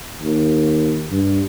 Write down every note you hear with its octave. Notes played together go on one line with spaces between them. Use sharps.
D#2
G2